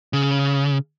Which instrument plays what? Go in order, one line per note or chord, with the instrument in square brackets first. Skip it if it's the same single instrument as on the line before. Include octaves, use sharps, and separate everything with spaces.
[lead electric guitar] C#3